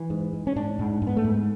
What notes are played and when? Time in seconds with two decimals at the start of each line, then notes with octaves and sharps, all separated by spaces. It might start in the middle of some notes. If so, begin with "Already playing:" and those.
Already playing: E3
0.10 G#2
0.33 G#2
0.47 C#4
0.56 G#2 D4
0.79 G#2
1.02 G#2
1.07 B3
1.17 A3
1.24 G#2